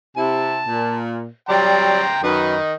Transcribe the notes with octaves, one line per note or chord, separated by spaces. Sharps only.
C3 E4 A5
A#2
F#3 G3 D5 G5 A#5 C6
F#2 D#3 D#4 B4